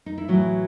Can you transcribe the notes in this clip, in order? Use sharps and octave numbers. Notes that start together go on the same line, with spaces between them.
D#4
E4
A2 E3 F#3 F#4